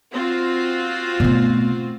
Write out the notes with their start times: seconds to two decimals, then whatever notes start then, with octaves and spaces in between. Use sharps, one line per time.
0.12 C4 F4 F#4
1.20 B2 A3